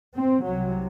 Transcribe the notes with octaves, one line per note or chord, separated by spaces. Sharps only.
C4
C2 C3 F#3